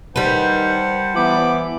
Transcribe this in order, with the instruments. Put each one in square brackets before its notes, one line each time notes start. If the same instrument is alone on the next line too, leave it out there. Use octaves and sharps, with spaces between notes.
[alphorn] D#3 [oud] G3 B4 [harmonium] C5 F#5 A5
[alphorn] E3 [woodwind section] B3 B5 D6